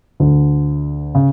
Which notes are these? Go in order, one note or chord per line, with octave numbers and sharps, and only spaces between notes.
D2 D3
C#3